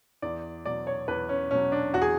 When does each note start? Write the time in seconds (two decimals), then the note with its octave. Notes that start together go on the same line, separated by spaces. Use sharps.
0.22 E2 D5
0.65 B2 F#3 D5
0.87 C#5
1.08 E2 B4
1.29 C#4
1.51 B2 F#3 C#4
1.72 D4
1.93 E2 F#4
2.02 G#4